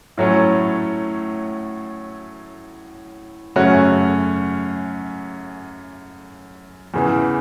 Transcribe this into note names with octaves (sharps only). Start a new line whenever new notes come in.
A2 F#3 A3 C#4
F#2 C#3 A3 C#4 F#4
E2 C#3 E3